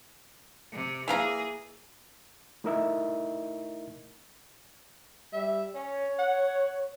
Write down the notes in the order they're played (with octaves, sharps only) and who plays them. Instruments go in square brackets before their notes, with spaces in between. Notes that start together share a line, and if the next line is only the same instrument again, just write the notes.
[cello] C3
[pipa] E3 F5 A#5 [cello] A#3 G#4
[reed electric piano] A3 D#4 E4 A#4 D#5 E5
[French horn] G3 [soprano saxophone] E5
[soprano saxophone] C#4 [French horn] C#5
[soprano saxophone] F#5